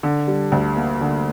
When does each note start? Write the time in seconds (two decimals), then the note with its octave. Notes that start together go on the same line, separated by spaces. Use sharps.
0.03 D3
0.27 G3
0.52 D2
0.76 A#3
1.01 D3